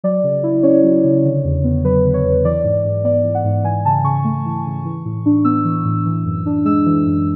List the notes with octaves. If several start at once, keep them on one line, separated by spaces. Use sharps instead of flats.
F#3 D5
C#3
E4
C#4 C#5
F#3
C#3
D3
E2
B3
F#3 B4
D3
C#5
E2
E3 D5
G#2
G#2
B3 D5
E3
F#5
G#2
E3 G#5
C#3 A5
C#3 C#6
A3
E3
C#3
E3
A2
D4
B3 E6
E3
A2
E3
F#2
D4
G#3 E6
E3
F#2